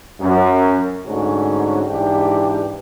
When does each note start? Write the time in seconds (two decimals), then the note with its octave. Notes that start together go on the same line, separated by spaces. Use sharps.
0.19 F#2
1.06 G#2 D3 A3 C#4 F#4
1.86 G#2 E3 D4 G4